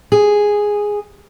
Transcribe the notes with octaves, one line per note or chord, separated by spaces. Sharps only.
G#4